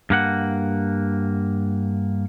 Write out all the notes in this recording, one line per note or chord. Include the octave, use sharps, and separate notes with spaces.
G2 A#3 F#5